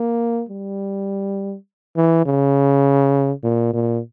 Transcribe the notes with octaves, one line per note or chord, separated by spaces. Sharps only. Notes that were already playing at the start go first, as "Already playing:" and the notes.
Already playing: A#3
G3
E3
C#3
A#2
A#2